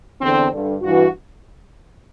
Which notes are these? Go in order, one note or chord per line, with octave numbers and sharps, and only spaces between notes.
E2 D3 C4
G2 D3
G2 E3 F#4